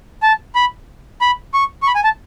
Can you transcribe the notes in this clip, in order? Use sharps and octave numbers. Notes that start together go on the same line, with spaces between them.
A5
B5
B5
C#6
C#6
B5
G#5
A5